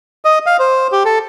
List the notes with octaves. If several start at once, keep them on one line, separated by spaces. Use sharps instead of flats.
D#5
F5
C5
G4
A4